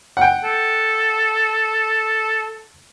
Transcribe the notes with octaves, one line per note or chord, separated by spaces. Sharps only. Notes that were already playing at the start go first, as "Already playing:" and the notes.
F#5 G5
A4